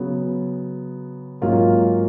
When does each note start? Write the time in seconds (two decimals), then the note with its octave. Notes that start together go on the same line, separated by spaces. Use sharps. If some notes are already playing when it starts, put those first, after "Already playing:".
Already playing: C#3 F#3 B3
1.42 G#2 F#3 A#3 C#4 F4